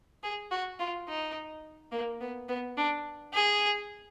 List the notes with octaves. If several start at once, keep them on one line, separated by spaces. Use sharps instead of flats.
G#4
F#4
F4
D#4
A#3
B3
B3
D4
G#4